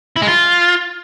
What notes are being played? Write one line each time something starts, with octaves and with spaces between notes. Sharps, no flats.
E4
G#3
F4